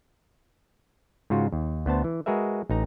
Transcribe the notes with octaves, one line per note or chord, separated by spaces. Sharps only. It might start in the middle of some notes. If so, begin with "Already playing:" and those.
G#2 C#3 F4 F#4
D#2
D2 B3 C5 A5
E3
G#3 F#4 G#4 A#4 B4 E5
A1 D#4 A#5